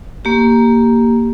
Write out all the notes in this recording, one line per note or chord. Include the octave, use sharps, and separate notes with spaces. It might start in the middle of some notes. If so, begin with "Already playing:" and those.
A#3 G4